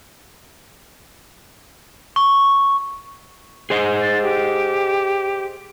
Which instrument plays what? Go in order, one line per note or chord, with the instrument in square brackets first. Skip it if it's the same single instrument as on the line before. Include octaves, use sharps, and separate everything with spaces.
[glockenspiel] C#6
[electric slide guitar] G#4 C5 D#5
[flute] A6
G4